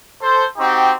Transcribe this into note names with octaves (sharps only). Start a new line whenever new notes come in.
A4 C5
C4 D#4 F#4 G4